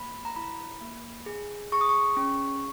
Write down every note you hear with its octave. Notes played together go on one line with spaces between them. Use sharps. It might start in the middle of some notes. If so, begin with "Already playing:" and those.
Already playing: A#3 B5
A#5
E4 B5
A#3
G#4
G#4 C#6
D#6
C#6
C#4